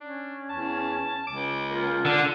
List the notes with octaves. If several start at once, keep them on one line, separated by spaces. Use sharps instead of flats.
C#4 D4
E2 A5
C#2 D6
A#3 F4
D3